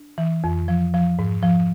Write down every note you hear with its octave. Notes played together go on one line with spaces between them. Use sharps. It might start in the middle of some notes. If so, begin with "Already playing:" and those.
Already playing: D4
E3
F2
F3
F3
G#2
F3